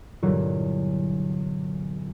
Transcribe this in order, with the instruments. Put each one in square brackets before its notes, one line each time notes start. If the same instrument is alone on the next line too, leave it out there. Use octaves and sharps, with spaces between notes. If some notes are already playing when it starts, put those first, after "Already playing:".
[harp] E2 G2 A#2 D3 E3 F#3